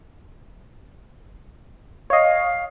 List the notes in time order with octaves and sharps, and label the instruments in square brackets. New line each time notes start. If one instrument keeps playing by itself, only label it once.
[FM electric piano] C#5 D#5 [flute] F5